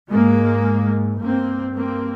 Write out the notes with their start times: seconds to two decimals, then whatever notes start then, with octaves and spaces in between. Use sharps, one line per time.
0.10 G#2 G#3 A#3
1.20 G2 A#3 C4
1.75 A#3 C4